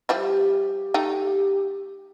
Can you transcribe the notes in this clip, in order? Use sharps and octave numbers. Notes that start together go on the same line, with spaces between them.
F3 G3 E4 G4
A3 D#4 G5